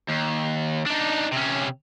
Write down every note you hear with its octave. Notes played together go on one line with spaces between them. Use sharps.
D#2
D4 D#4
C3 C#4